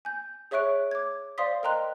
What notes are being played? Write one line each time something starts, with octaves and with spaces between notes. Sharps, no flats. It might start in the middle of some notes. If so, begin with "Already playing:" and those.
G#5 G6
G#4 C#5 E5 C#6 F#6 D7
D6 G#6
C5 D5 F5 C6 D#6 B6
A#4 D#5 G5 A#5 C6 F#6